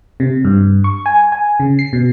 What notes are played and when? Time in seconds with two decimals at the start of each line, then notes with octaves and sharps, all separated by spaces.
0.20 C3
0.45 G2
0.84 C#6
1.06 G#5
1.32 G#5
1.60 C#3
1.79 C7
1.93 B2